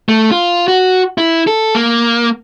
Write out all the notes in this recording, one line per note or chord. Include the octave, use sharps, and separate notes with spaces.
A3
F4
F#4
E4
A4
A#3